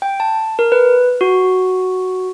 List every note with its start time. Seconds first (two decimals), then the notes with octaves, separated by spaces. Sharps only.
0.02 G5
0.20 A5
0.59 A#4
0.72 B4
1.21 F#4